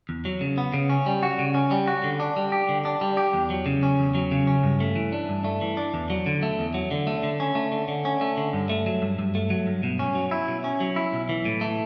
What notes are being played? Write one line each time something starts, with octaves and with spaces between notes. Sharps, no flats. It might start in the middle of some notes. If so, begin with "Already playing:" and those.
E2
F#3
C#3
B3
C#3
C#4
G3
F#4
C#3
C#4
G3
F#4
D3
D4
G3
G4
D3
D4
G3
G4
E2
F#3
C#3
C#4
E2
F#3
C#3
C#4
G2
A3
E3
D4
G2
A3
E3
D4
E2
F#3
D3
A3
E2
F#3
D3
A3
D3
C#4
A3
D3
D3
C#4
A3
D3
G2
A3
F#3
G2
G2
A3
F#3
G2
B2
C#4
F#3
E4
B2
C#4
F#3
E4
B1
E3
A2
A3